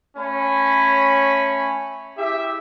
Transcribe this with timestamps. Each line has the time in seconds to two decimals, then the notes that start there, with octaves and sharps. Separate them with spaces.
0.17 A3 C#4 C#5 G#5 B5
2.18 E4 G4 G#4 E5